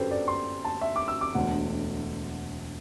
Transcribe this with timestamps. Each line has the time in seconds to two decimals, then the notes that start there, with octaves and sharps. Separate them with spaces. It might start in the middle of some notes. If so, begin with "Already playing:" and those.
Already playing: G1 F#2 G4 A4 B4 C5
0.11 D5
0.28 C6
0.65 A5
0.81 E5
0.96 D6
1.08 E6
1.21 D6
1.35 E1 D2 D3 F#5